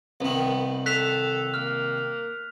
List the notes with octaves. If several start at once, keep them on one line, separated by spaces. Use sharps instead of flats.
C2 D#3 B3
A4 F#6 B6 F7
A#3 F6